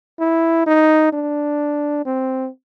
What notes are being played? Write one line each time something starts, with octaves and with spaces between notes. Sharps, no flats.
E4
D#4
D4
C4